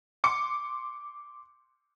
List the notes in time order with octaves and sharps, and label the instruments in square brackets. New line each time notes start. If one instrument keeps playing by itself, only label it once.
[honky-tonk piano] C6 D6 C#7